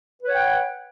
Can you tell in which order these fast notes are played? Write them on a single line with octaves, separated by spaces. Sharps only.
B4 C#5 F#5 G5